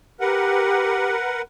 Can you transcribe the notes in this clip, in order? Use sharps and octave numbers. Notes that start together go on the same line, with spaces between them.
G4 A#4 B4 F#5